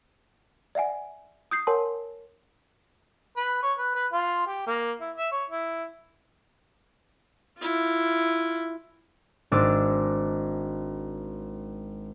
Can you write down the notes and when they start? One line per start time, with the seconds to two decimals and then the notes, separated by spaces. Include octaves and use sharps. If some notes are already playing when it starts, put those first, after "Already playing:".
0.75 D5 E5 F#5 G#5
1.51 D#6 G6 C7
1.67 A#4 C#5 F#5 G#5 A5 C6
3.37 B4
3.63 C#5
3.78 B4
3.95 B4
4.13 F4
4.46 G4
4.67 A#3
5.01 E4
5.17 E5
5.32 C#5
5.50 E4
7.58 E4 F4
9.52 G#1 G#3 D4 D6 E6